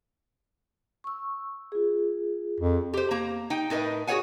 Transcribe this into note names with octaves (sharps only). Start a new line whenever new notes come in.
C#6 E6
F4 G#4
F2
G4 C5
A#3 A#5
D#4 G5
A2 D#4 A#4 B4 D#5
F#4 G#4 A4 C#5 F#5 G#5